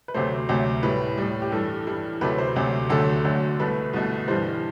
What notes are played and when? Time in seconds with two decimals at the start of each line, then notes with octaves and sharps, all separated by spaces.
0.08 B4
0.14 D2 C3 F#3 A3 C5
0.49 D2 C3 F#3 A3
0.83 A2 G3 B4
1.18 A2 G3
1.42 G4
1.52 G2 E3 G3 A4
1.87 G2 E3 G3
2.21 D2 C3 F#3 A3 B4
2.38 C5
2.56 D2 C3 F#3 A3
2.90 D2 D3 F#3 A3 A4
3.24 D2 D3 F#3 A3
3.59 C2 B2 A3 B4
3.93 C2 B2 A3
4.28 G2 E3 G3 C5